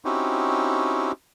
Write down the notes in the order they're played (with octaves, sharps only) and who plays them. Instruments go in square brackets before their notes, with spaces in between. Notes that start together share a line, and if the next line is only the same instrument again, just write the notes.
[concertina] C4 C#4 D#4 E4 F#4 G4